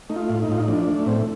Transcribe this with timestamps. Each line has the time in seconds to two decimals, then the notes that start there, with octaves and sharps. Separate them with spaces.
0.10 A3 D#4
0.16 F4
0.30 A2
0.42 D#4
0.49 A2 F4
0.60 D#4
0.68 F3 D4
0.88 A3
1.06 A2 C4